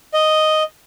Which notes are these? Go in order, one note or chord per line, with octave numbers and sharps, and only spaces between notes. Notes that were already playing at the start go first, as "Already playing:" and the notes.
D#5